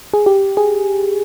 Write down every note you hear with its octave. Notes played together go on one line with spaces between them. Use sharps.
G#4
G4
G#4